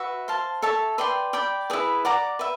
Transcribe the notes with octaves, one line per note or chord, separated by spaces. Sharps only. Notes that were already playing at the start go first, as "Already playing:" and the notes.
Already playing: F#4 B4 E5
C5 F5 A5
A4 C#5 E5 A5
B4 D5 G5 C6
D5 G5 B5
E4 G#4 B4
D5 F#5 A#5 D6
B4 E5